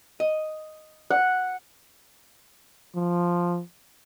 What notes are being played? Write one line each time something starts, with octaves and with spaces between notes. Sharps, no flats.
D#5
F#5
F3